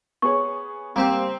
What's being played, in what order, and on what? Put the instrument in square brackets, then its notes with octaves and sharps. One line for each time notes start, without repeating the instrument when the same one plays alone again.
[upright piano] B3 G#4 C#5 [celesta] C#6
[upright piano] G3 [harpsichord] A#3 G4 G5 [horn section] C4